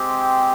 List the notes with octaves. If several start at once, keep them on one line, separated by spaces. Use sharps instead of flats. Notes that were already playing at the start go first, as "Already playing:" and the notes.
Already playing: G#3 C4 G4